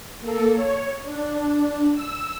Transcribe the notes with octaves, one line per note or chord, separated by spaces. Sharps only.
A#3 A4
C#5
D4
E6